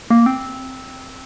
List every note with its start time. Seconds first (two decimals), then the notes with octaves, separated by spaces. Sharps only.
0.10 A#3
0.26 C4